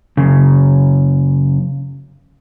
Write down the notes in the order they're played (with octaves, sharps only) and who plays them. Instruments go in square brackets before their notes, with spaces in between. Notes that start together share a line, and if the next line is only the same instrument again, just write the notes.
[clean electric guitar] F#2 C#3